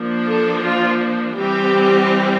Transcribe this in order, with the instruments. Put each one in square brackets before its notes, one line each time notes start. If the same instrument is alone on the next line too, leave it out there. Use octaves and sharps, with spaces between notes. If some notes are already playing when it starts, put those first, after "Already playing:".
Already playing: [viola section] F3 A#3 D4
A4
F4
E3 G3 C4 G4